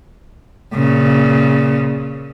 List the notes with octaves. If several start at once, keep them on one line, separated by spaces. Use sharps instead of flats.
A#2 C#3